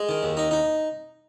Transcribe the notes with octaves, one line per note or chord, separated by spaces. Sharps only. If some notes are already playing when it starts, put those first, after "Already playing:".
Already playing: G#3
D#3
D#2
D#4
D#4